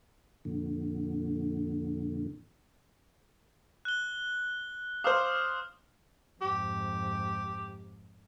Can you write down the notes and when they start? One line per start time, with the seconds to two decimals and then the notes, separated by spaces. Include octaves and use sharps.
0.45 F2 A#2 D3
3.85 F#6 G7
5.04 C5 F5 D6 D#6 F6
6.41 F2 G#2 G4